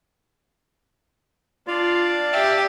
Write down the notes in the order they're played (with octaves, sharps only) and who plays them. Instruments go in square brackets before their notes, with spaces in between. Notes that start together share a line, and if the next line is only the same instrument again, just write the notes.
[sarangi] D4 [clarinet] F4 [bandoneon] D5 F5
[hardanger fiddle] G4 [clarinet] E5